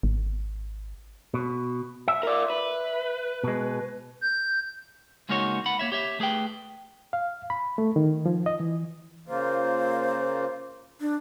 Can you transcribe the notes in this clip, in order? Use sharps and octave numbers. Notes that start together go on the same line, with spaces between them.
G#1
B2
E5
A#4 D5
B4
B2 G#3
G6
C#3 G#3 A#3 D#4 F#4 C#5
F#5 B5
A#3 C#5 E5
G4 C#5 E5
A3 G#4 B4 G5
F5
B5
A3
D#3
F3
D#5
E3
C#3 A#3 F4 C5
D4